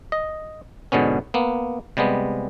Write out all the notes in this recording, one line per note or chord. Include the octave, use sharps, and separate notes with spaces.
D#5
G#2 B2 D3 B3 C#4
A#3 B3
C3 G3 G#3 B3